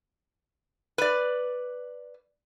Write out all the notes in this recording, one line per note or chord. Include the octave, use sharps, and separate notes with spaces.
B4 D5